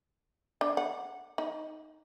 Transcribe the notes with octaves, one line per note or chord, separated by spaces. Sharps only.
D4
F#5
D#4